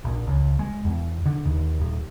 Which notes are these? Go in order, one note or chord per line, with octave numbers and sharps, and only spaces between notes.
A#1
C#2
G#3
E2
D3
D#2
D#1